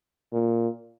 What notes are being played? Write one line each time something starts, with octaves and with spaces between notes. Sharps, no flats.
A#2